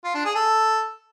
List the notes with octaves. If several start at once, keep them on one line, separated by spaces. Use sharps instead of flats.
F4
D4
G#4
A4